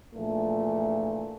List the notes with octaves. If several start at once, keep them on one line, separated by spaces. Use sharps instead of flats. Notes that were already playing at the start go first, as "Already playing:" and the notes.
A#1 A#2 E3 A3